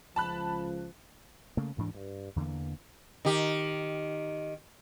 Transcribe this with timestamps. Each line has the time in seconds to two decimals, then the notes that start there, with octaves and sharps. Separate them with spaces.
0.16 C#2 F3 A5 B5 F#6
1.57 C#3 A3 A#3
1.77 D2 G#2 E3 D4
1.94 G2
2.36 E2 D3 E3 A#3
3.25 D#3 G4